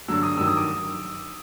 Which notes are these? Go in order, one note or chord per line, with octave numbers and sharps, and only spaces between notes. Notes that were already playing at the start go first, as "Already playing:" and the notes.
G2 D3 F#3 E6
D#6
G2 D#3 F#3 E6
D#6
D6